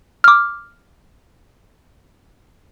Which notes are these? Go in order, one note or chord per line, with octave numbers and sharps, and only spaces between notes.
D6 F6